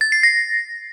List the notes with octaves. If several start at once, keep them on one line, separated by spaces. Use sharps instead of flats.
A6
C7
A#6